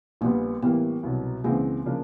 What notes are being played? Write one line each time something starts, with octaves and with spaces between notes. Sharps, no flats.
A#1 A#2 G3 A#3 B3
A2 E3 G3 A#3 B3
C2 B2 F#3
C#2 C#3 E3 G#3 A#3 C4
C#3 F3 A#3 D4